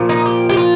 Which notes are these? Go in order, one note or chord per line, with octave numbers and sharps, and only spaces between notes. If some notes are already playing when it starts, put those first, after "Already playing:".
Already playing: A#2 F3
D#4
G4
G4
F4